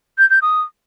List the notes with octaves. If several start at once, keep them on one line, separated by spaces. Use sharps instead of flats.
G6
G6
D#6